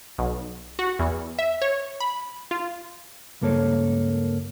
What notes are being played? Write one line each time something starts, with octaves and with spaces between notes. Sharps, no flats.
B1
F#4
E2
E5
C#5
B5
F4
C#2 G2 A#3 A4 A#4 C#5